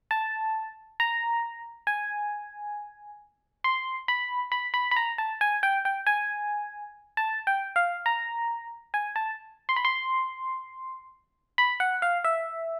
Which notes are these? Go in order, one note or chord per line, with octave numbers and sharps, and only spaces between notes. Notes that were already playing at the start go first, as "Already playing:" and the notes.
A5
A#5
G#5
C6
B5
B5
B5
B5
A#5
A5
G#5
G5
G5
G#5
A5
G5
F5
A#5
G#5
A5
C6
B5
C6
B5
F#5
F5
E5